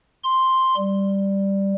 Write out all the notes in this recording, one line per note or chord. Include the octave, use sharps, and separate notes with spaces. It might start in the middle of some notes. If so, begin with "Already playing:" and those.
C6
G3